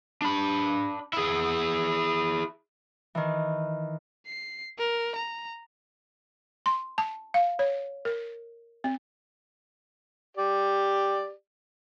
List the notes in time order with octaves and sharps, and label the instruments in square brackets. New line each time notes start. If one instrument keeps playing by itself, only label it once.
[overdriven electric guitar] D4 B5
E4 G#4
[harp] D#3 E3
[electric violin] C7
A#4
A#5
[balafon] C6
A5
F5
C#5
A#4
C4
[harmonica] G4 D5